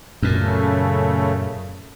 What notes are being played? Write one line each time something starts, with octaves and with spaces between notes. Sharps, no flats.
F#2 A#2 C#3 A3